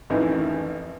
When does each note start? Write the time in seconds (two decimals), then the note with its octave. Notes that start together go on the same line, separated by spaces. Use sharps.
0.10 A1 F2 D#3 E3